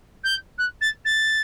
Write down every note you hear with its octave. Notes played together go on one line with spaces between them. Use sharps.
G6
F#6
A6
A6